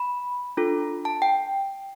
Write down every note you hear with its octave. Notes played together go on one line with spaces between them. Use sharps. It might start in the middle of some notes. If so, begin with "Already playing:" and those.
Already playing: B5
D4 F4 A4
A5
G5